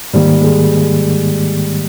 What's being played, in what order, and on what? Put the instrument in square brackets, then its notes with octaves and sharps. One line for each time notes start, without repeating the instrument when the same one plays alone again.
[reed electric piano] G#2 D#3 A#3 [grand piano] G3
[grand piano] G#3